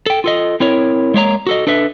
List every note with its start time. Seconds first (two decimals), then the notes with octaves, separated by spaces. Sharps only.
0.06 A4 G5
0.24 F4 A4 D#5
0.60 C4 E4 A#4 C#5
1.14 G#3 A#3 C#5 A#5
1.47 F#4 A4 D#5
1.67 D4 A4 B4 E5